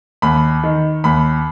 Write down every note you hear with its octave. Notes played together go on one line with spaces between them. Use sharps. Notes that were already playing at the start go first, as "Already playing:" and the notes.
D#2 B5
D#3
D#2 B5